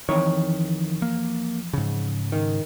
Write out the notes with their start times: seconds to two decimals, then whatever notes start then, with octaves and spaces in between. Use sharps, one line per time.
0.09 F2 D#3 E3 C#5
1.02 A#3
1.73 G#2 C#3
2.32 D#3